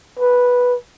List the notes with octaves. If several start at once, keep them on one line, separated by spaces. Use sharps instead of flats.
B4